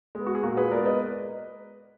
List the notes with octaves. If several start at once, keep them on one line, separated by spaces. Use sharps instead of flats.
G#3 B3
F#4
G#4
A#2 F#4 A#4
G#4 B4
G#3 B3 A#4 D5
B4 D#5